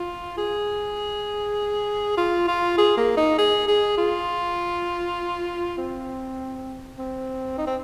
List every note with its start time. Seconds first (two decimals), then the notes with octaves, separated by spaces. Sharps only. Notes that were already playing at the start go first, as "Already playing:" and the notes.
Already playing: F4
0.37 G#4
2.17 F4
2.48 F4
2.78 G#4
2.97 A#3
3.17 D#4
3.38 G#4
3.68 G#4
3.97 F4
5.78 C4
6.98 C4
7.58 D#4
7.67 C4